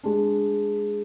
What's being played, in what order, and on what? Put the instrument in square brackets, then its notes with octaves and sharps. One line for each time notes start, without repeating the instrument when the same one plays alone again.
[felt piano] G#3 D4